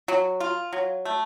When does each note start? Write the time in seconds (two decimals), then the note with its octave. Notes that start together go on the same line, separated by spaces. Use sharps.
0.08 F#3
0.40 F4
0.73 F#3
1.05 A3